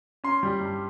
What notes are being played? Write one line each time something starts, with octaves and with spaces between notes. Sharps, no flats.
C#4 C6
G3
G2